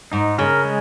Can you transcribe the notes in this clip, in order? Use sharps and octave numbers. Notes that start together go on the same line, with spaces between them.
G#2 D#4
C#3 A#4
G#3